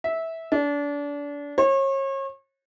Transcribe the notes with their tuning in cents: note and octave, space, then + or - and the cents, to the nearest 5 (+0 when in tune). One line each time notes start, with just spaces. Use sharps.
E5 -15
D4 -30
C#5 -35